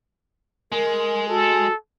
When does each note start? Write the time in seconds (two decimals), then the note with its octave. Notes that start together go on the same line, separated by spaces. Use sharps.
0.72 G#3 A#4
1.29 F#4 A4